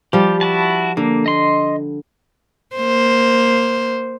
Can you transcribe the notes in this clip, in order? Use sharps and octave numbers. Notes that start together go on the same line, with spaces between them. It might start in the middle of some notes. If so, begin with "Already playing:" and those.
F3 G3 G4
E4 F#4 A5
D3 A#3
D#5 C6
A#3 C5